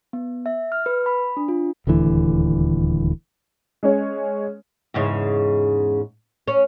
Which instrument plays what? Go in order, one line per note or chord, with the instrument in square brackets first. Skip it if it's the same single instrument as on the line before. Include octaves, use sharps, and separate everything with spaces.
[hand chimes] B3
E5
F6
B4
B5
D4
F4
[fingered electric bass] D#1 D2 D3 E3
[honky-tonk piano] G#3 C#4 C#5
[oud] E2 G#2 C#3
C#4